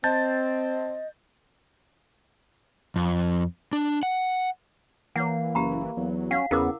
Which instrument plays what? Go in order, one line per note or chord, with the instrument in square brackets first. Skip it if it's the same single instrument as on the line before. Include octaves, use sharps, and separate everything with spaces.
[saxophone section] C4 [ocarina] D#5 [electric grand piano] A5 G6 A6
[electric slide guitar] F2
D4
F#5
[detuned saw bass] E3 [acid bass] A#3 [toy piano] C#5 F#5
[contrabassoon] F#1 [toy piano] G4 A#5 B5
[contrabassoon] E2 [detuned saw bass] F#3
[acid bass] C#4 [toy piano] F5 F#5
[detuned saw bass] E2 [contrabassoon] C#3 [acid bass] B3 [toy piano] E4 A#4 D6